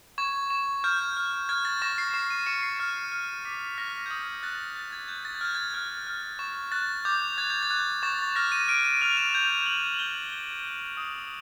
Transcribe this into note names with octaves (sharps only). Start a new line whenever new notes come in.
C#6 G#6
C#6
F6 G6
F6
F6 G#6
A6
C#6 A#6
C7
C#6 C7
D#7
C#6 C#7
C7
F6
F6
D6 B6
F6 A#6
G6
D#6 G#6
F#6 A6
F#6 A6
G#6
F#6 G6
A6
G#6
F6 G6
G#6
F6
F6
C#6
F#6 A6
D6 G6
F#6 G#6
G6
G#6
F#6
C#6 A6
A6
F6 A#6
D#7
F6 D7
D#7
F6 F7
E7
G6 F7
G6 F#7
F#7
G6 G7
G6 G7
F#6
D#6